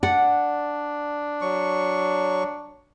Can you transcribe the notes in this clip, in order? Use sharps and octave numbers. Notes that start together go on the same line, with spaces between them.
D4 D5 F#5
F#3 C#6